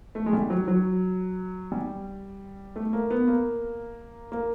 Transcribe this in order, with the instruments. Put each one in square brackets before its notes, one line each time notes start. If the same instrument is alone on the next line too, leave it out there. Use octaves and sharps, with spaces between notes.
[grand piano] A3
G#3
G3
F#3
F#3
G3
A3
A#3
B3
A#3
A#3